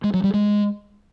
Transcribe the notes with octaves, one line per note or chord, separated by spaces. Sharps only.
G#3
F#3
G3
G#3